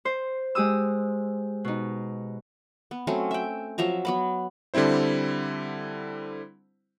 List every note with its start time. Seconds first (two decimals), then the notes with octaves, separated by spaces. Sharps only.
0.05 C5
0.55 G#3 G4 D#6 E6
1.65 B2 D#4
2.91 B3
3.07 F#3 A3 C4 C#4
3.31 E5 G5
3.78 F3 F#3 E5 A#5
4.05 F#3 B3 B5
4.74 D3 G3 C4 E4 C5